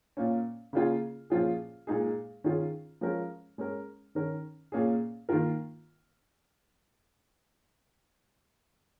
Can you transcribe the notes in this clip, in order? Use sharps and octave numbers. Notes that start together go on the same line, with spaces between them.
A#2 A#3 C#4
C#3 A#3 C#4 F4 G#4
A#2 F3 C#4 F4 G#4
A#2 G#3 D#4 G#4
D#3 C#4 F4 G#4
F3 G#3 C#4 A#4
G#3 C#4 A#4
D#3 C#4 A#4
A#2 A#3 C#4 G#4
D#3 A#3 F4 A#4